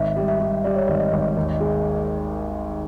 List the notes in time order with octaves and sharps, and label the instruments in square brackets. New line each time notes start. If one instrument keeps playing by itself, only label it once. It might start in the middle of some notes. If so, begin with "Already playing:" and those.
Already playing: [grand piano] G#1 [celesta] E5
[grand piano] G3
[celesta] E5
[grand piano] G3
[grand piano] G3 [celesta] D5
[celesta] C#5
[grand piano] G#1 [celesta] D5
[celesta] D#5
[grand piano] G#1
D#2
G#3